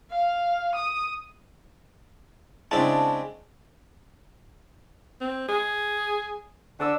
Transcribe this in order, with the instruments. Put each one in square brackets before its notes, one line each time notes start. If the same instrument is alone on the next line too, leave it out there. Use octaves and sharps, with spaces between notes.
[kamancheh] F5
D#6
[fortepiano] C#3 D4 E4 [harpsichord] G#3 C4 [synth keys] A5
[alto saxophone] C4
G#4
[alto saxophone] D3 [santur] D4 D5 E6